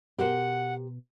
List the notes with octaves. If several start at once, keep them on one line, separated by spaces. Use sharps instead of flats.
B2 G4 A#4 C5 F#5